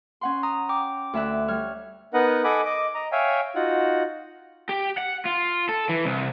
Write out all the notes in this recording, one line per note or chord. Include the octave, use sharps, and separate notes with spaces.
C#4 F#5 C6
A#5 D#6
G5 D6
D2 E5 F#6
G3 C#5 F6
B3 D#4 A#4 B4 D#5 F#5
A4 D#5 F#5 G#5 B5 D6
D#5 D6
D#5 A#5
C#5 E5 F5 G5 G#5
D#4 F4 F#4 F#5
G4
F#5
F4
A4
E3
C2